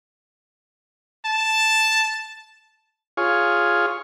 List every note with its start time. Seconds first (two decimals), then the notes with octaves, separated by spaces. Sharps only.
1.25 A5
3.17 F4 G#4 C#5